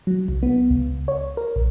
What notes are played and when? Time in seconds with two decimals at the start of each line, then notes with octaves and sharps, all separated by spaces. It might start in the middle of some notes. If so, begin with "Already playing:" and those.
0.07 F#3
0.28 C2
0.43 B3
0.70 C#2
1.08 C#5
1.37 A#4
1.56 A#1